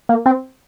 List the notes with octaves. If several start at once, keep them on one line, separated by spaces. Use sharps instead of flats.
A#3
C4